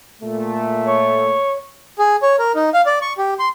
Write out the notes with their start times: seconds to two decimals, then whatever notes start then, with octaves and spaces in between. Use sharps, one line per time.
0.22 A#2 A3
0.86 C#5
1.99 G#4
2.22 C#5
2.39 A#4
2.55 D#4
2.74 F5
2.86 D5
3.02 C#6
3.18 G4
3.39 C6